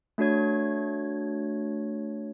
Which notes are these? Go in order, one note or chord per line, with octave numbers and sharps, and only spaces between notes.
A3 D4 F#4 C#5 G#6